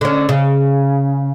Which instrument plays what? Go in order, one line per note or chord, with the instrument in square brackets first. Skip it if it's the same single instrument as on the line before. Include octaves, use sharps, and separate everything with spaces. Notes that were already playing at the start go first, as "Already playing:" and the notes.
[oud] D3 C#4
C#3